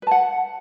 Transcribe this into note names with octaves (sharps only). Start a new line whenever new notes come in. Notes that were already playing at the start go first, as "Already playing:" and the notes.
B4 F#5 A5